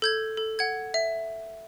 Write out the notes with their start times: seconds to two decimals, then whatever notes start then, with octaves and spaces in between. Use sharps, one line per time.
0.02 A4 G6 G#6
0.37 A4
0.59 F#5 G#6
0.94 E5